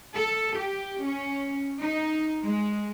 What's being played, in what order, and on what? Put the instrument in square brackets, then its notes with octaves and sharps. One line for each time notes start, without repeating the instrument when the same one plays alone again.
[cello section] A4
G4
C#4
D#4
G#3